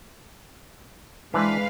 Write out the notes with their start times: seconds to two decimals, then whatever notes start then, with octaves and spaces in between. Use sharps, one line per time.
1.34 E3 G#3 D4 B4 C5 F5